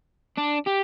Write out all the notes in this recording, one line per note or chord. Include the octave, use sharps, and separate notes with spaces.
D4
G4